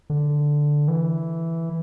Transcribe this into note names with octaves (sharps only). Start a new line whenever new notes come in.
D3
E3